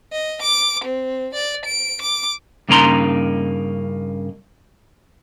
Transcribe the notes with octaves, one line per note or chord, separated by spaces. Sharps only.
D#5
D6
C4
D5
D7
D6
G2 C#3 A#3 D#4 A#5 C6